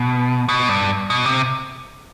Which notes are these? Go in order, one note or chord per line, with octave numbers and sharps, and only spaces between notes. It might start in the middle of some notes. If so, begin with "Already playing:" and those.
Already playing: B2
B2
G2
B2
C3